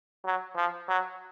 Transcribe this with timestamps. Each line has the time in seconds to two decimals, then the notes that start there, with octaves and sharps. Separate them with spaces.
0.25 F#3
0.56 F3
0.88 F#3